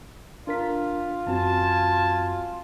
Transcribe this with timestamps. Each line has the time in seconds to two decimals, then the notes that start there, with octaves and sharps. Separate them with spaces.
0.47 D4 F4 A#4 B6
1.27 F#2 C4 F#4 G#5 A5